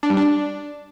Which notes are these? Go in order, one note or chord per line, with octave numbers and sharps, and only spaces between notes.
D4
G3
D4